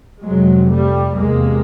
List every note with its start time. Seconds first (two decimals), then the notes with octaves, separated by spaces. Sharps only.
0.22 F2 C3 F#3 G#3
0.68 G3 A3
1.15 E2 C3 G#3 A#3